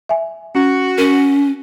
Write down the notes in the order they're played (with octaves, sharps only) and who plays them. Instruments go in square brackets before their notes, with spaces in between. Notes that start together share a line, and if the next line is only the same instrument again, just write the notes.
[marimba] E5 G#5
[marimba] C#4 [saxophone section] F#4
[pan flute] C#4 [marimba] A#4